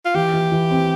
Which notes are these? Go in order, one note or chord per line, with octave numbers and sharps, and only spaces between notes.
F4
E3 G4
E3
E3
C4